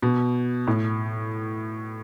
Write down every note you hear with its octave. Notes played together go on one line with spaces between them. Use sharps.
B2
A2